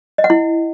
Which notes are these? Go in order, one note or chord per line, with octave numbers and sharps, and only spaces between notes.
D#5
F#5
E4